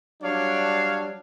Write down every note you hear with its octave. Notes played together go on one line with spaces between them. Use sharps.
F#3 G3 D4 C#5 F5